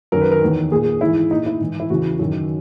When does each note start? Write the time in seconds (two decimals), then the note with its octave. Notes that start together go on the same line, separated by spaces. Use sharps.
0.12 F#2 D#3 A#4
0.21 B4
0.32 A#4
0.42 E2 D#3
0.71 A#2 G#4
1.01 G#2 E4
1.05 E3
1.31 A#2 D#4
1.46 E4
1.60 G#2 E3
1.80 E4
1.90 E2 C#3 E3 F#4
2.19 F#2 D#3